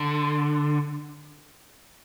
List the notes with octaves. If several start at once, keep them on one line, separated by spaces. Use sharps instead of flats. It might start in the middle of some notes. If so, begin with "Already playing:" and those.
Already playing: D3